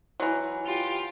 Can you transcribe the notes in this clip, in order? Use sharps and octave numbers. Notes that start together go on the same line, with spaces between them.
E3 F#3
F4 G4